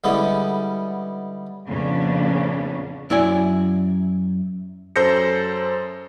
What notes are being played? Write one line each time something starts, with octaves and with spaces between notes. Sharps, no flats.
D3 G3 G#3 B3 C#4 E4
F2 A#2 C#3 B3 C#4 D4
F#2 E4 D5 G#5
F#2 A4 C5 G6 A#6 C#7